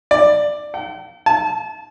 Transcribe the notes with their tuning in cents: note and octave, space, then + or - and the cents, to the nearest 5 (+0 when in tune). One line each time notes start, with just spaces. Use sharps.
D5 +10
G5 -45
A5 -35